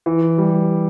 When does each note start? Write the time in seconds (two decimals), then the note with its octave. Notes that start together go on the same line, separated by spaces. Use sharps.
0.06 E3
0.38 G3